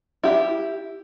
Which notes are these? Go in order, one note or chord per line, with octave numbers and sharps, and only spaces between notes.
E4 G4